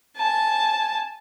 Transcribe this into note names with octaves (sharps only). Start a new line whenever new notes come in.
G#5 A5